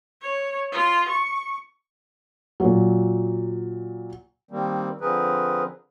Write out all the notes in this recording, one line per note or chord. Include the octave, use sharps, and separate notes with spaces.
C#5
F4
C#6
A#2 F#3
D#3 G3 A#3 C4
D3 F3 C4 G#4 A#4 B4